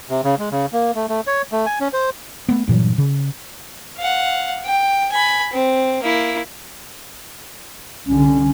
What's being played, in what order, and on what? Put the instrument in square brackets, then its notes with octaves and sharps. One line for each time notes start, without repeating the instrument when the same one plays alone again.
[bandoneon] C3
C#3
G#3
C#3
A#3
A3
A3
C#5
A3
G#5
C#4
C5
[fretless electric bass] A3 B3
G2 A#2 E3 F#3
C#3
[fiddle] F5 F#5
G5
G#5 B5
C4
A#3 E4
[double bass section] C2 D3 [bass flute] C#4